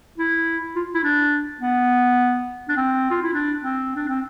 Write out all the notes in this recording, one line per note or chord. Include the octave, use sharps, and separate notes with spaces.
E4
F4
E4
D4
B3
D4
C4
F4
E4
D4
C4
D4
C4